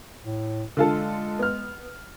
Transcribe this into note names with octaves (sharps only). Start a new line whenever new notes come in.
A2
D3 G#3 F4 A4
B3 F6